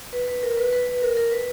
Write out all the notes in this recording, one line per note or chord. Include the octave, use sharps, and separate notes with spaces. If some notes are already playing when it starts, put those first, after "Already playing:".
B4
B4
A#4
B4
B4
B4
A#4
A#4
B4